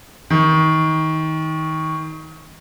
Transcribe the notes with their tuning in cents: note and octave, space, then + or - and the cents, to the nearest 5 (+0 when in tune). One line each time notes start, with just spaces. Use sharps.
D#3 +25